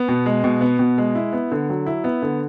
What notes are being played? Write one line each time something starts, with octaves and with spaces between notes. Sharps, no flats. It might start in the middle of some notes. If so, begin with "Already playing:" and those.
Already playing: B3
B2
G#3
B2
B3
B2
G#3
E4
B3
D3
F#3
E4
B3
D3